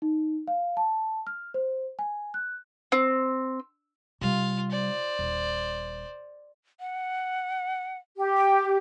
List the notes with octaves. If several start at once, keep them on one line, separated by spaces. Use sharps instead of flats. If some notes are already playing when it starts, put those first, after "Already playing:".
D#4
F5
A5
F6
C5
G#5
F#6
C4
C3 G3 F4 F5
C5 D5
D#1
F#5
G4
G5